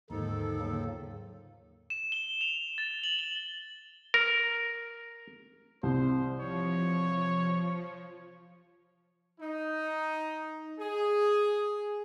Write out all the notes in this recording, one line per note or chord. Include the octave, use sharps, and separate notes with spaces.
D#2 G#2 D3 D#3 F3 D#4 A4
C#3 F#3 A#3
E7
G7
F7
A6
F#7
G7
A#4
C2 C5
F3 C#5
D#4
G#4